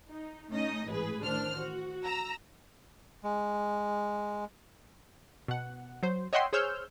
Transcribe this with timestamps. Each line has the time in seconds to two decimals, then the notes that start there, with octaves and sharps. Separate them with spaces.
0.10 D#4
0.51 A3 C#4 D#4 D#5
0.87 A1 G#2 G#4 B4
1.24 A1 D#3 D4 C5 F6
1.61 F#4
2.03 A#5 E6
3.24 G#3
5.48 B2 F#5
6.03 F#3 C5
6.33 C#5 D#5 E5 F#5 G5 C6
6.53 G#4 C5 C#5 E6 F6 G6